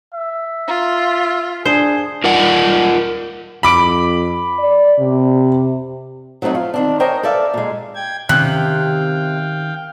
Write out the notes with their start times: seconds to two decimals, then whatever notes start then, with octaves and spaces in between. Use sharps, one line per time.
0.14 E5
0.67 F4
1.65 D4 G#4 C5
2.24 F4 A#4 D5 F#5
3.63 F2 B5 D6 D7
4.59 D5
4.99 C3
6.42 F#3 A3 C4 D#4 F#4
6.55 F4
6.74 D#3 C4 D4
7.00 A#4 C5 C#5 D#5 G5 G#5
7.23 A4 B4 D5 E5 F5
7.54 A#2 G#3
7.95 G5 G#6
8.29 C3 D#3 C4 C#4 F5 G5 F#6